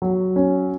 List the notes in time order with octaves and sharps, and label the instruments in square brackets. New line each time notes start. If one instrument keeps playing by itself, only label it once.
[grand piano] F#3
C#4